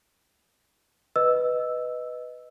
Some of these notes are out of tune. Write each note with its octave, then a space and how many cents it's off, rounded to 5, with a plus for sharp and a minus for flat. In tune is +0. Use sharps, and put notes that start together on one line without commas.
B4 +0 D#5 +0 E6 +0